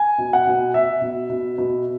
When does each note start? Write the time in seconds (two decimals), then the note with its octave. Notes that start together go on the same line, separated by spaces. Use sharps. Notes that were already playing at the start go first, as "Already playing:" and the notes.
Already playing: G#5
0.18 B2
0.33 F#5
0.47 B2
0.74 B2 E5
1.02 B2
1.30 B2
1.58 B2